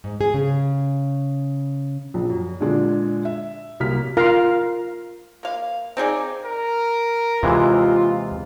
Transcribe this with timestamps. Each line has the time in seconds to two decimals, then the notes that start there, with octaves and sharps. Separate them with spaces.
0.04 G#2
0.21 G#4
0.34 C#3
2.14 A#1
2.30 F#2
2.60 A#2 D3 G#3 D4
3.25 E5
3.80 C2 F#3 A#3 F6 B6
4.17 F4 A#4 F5 A#5
5.43 A#3 F5
5.97 C4 D#4 G#4 D5
6.45 A#4
7.43 D#2 C3 E3 G#3 F4